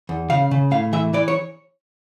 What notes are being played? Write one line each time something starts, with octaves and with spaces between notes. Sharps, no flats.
E2
C#3 F5
C#3
A2 F5
E3 E5
E3 D5
C#5